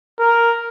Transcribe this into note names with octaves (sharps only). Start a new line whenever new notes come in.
A#4